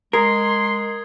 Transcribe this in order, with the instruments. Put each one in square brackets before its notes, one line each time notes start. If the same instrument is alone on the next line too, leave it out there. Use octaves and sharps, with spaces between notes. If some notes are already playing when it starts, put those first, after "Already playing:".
[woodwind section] G#3 [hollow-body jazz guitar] A#4 [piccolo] C6 [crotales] D#6 G#6 C7